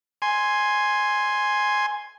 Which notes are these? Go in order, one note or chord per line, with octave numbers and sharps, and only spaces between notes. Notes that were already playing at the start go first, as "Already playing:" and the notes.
G#5 C6